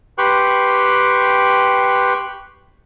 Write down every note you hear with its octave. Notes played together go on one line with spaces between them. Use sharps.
G4 B4 G5 C6 C#6 F#6